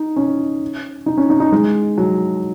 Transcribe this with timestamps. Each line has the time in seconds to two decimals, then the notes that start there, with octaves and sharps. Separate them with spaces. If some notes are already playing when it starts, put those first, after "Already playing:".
Already playing: D#4
0.16 C#4
1.06 D#4
1.17 C#4
1.30 D#4
1.40 D#4
1.52 G#3
1.98 F#3